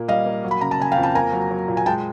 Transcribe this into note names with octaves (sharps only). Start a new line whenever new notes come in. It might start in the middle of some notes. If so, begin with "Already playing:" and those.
Already playing: A#2 A#3
G3 D#5 F5
A#3
F#3
B5
C#3 A#5
A5
C#3 G#5
F5 G5
F2
G5 A5
A#3 G#5 A#5
F#3
F#3
A#2
G#5
G#3 G5 A5